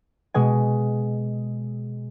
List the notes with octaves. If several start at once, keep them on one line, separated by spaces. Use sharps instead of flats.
B2 G#3 G#5